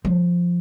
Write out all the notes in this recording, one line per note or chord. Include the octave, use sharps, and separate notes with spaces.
F3